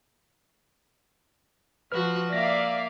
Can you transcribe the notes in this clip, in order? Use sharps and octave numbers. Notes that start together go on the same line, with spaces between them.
F3 F#4 B4 F6
A#3 D5 E5 F5 A#6